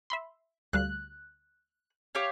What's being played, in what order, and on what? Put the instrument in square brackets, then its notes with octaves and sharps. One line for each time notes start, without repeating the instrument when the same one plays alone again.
[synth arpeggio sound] E5 B5 C6
[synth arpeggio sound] D2 G3 F5 [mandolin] F#6
[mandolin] G4 C#5 F5